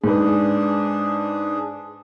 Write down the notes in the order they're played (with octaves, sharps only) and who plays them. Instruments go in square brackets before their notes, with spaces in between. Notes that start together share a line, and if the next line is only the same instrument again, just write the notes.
[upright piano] G#2 B4 [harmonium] D4 G#4